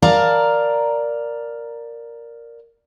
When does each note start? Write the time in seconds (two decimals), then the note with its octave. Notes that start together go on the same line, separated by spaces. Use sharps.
0.02 A#4 D5 F5 A5 A#5